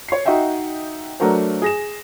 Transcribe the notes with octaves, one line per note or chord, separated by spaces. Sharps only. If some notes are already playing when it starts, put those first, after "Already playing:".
C#5 C7
D#4 F#4 D#5 E5 G5
F#3 A3 D4 F#4 A#4 C5
G#4 A#6 E7